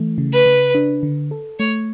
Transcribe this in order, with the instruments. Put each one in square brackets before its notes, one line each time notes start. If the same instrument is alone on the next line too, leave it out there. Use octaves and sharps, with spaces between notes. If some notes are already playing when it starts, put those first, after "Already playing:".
Already playing: [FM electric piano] E3 A3
C#3
[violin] B4
[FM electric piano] C#3
D4
D3
A4
[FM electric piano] A3 [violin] C#5